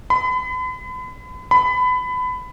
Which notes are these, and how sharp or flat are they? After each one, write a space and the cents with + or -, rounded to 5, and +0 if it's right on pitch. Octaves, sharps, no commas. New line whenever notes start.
B5 +40
B5 +25